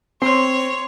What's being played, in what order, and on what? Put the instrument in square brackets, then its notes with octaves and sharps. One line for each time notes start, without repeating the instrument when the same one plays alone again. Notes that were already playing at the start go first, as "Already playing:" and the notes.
[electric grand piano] C4 [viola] C#5 [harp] C6